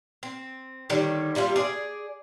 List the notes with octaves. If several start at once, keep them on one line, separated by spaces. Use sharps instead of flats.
C4
D3 D#3 G3 C#4
C3 G3 A#3 F4
G#4 D5